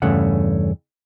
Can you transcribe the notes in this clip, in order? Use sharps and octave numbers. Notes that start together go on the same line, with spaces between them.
E2 G2 C#3 A3 C#4 F#5